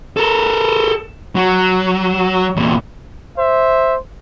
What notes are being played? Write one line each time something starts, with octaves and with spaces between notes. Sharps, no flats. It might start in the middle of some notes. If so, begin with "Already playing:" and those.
A4 A#4
F#3
E2 A#2
C5 E5